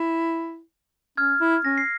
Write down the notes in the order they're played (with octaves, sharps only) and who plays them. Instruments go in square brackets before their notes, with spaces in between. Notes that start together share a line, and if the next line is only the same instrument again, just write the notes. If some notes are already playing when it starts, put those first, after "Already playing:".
Already playing: [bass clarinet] E4
[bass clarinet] C#4 [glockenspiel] F6 G#6
[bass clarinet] E4
[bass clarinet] C#4 [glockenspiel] A#6
[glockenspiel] C7